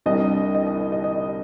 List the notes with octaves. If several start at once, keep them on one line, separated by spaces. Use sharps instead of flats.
C2 C3 G3 D4 D#5
D#5
D#5
D#5
D#5
D#5